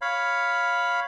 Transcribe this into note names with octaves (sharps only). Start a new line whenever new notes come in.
C#5 F5 B5